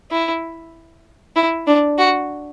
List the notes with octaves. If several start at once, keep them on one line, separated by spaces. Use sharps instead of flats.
E4
E4
D4
F#4